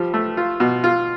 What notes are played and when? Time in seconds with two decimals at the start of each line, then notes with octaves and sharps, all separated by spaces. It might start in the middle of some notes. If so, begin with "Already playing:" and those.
Already playing: F3 G3
0.14 A3
0.37 F4
0.60 B2
0.84 F4